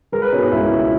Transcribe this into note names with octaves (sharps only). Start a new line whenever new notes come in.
G#3 A#4
B4
B2 C#4
D#4
C#2 E4
C#2